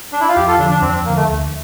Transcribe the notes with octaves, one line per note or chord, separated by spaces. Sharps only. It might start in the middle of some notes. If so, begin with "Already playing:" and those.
D4
E4
F4
F2 G4
F4 A4
D3 F3 D4
D4
F2 C4
D4
C4
D3 F3 A#3
A3
D2